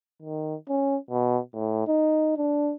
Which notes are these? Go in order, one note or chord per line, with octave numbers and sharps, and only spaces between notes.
D#3
C#4
B2
A2
D#4
D4